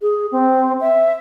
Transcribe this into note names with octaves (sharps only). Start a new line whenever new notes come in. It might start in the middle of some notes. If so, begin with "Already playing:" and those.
G#4
C4
E5